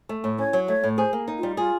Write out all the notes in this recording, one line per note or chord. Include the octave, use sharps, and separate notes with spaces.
A3
A2
C#4 C#5
F#3
A3 C#5
A2
G#4 C5
A#3
D#4
G3 F4
F4 G#4